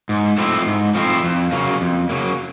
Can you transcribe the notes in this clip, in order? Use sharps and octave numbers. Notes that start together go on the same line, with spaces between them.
G#2
F3 A3 C4 E4
G#2
F3 A3 C4 E4
F2
C#3 F#3 A#3
F2
C#3 F#3 A#3